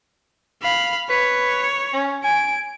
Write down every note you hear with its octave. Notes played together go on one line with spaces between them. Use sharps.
F5 B5
B4 C#5
C#4
G#5 D7